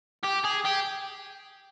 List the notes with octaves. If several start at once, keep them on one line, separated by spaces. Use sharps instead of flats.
G4
G#4
G4